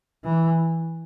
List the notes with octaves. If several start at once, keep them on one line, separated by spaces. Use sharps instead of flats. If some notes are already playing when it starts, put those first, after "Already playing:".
E3